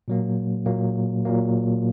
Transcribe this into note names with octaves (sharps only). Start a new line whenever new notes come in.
A#2 F#3 A#3
A#2 F#3 A#3
A#2 F#3 A#3